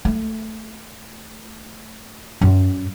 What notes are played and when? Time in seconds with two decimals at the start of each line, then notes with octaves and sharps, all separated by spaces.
0.05 A3
2.41 F#2